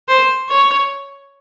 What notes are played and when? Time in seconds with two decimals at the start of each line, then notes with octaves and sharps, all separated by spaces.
0.09 C5
0.49 C#5